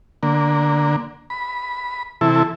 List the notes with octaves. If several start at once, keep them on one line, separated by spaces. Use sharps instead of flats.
D3 A#3
B5
C3 E3 E4 A4